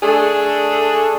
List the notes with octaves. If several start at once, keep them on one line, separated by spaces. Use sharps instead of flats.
A3 D4 G#4 A4